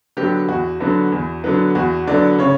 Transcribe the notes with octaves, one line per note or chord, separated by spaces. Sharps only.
D3 F#3 B3 G4
E2 F#4
D3 F#3 B3
E2
D3 F#3 B3
E2 F#4
D3 F#3 B3 D5
C#3 C#5